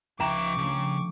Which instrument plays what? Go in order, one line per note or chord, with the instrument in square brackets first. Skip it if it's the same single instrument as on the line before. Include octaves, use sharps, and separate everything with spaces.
[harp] C#2 [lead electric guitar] F3 E5 [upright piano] G5 A#5 E7 [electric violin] C#6 D6
[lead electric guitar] C#3 [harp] F3 A3 D4